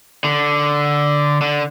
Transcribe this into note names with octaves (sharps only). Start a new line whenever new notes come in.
D3
D3